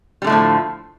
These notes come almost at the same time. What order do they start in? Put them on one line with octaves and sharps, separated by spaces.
G3 D3 A3 A2 F3